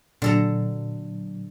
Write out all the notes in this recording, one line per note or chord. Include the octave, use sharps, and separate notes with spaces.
A#2 D3 F#3 A4 A#5